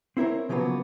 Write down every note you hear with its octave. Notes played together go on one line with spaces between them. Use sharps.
C4 E4 A#4 C#5
C#3 F3 F#3 A#3 B3